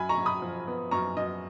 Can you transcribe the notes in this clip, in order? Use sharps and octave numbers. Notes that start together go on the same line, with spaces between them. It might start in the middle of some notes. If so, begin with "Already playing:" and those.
Already playing: F#2 G#5 B5
A#5 C#6
F#2
B5 D#6
F3
B3
F#2 A#5 C#6
F#2 D#5